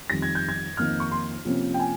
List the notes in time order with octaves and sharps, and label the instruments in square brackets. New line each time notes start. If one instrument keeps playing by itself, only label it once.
[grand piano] F2 D#3 G3 A#6
G#6
G6
G#6
F2 D#3 A#3 D#4 F6
C#6
C6
C3 F3 A#3 C#4
G5
G#5